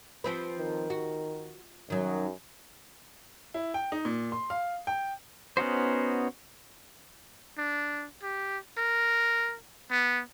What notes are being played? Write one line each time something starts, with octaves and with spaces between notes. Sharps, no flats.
F3 C4 B4
D#3
F#4
F#2 D#3 F#3
E4
G5
D#4
A#2
C6
F5
G5
B3 C#4 D#4 F#4 C5
D4
G4
A#4
B3